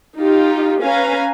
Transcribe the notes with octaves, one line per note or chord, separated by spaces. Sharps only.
D#4 F4 G4
C#4 B4 F5 G#5 A#5